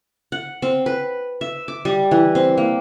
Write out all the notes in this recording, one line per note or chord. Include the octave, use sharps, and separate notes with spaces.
F#5
C4
B4
E5
D6
G3
E3
C4
A#3